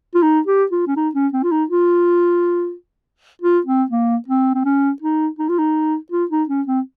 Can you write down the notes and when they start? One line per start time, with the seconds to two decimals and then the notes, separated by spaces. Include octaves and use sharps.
0.15 F4
0.23 D#4
0.47 G4
0.72 F4
0.87 C#4
0.97 D#4
1.15 C#4
1.33 C4
1.43 F4
1.51 D#4
1.70 F4
3.42 F4
3.67 C4
3.91 A#3
4.28 C4
4.55 C4
4.65 C#4
5.02 D#4
5.39 D#4
5.49 F4
5.59 D#4
6.12 F4
6.31 D#4
6.49 C#4
6.68 C4